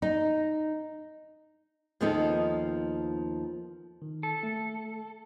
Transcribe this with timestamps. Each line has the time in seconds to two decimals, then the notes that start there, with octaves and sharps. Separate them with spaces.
0.02 D#4
2.01 D#2 F3 B3 C4 D#4 A4
4.02 D#3
4.23 A4
4.43 A3